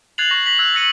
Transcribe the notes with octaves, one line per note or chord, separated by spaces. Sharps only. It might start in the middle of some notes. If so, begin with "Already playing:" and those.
F#6 G#6 A6 C7 F7 F#7
C#6 A#6
A#6 B6 F#7
E6 F#6 G#6
E6 A#6 C#7 D#7 F#7